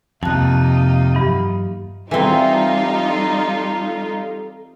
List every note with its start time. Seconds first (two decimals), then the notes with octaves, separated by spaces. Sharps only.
0.23 F2 C3 A#3 D#4 F4 A5 F#6
1.14 G2 E3 F#3
2.11 E3 G3 C4 D#4 F4 A4